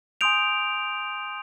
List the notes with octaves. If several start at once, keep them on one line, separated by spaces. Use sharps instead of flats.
G#5 C6 D#6 G6 D7 F7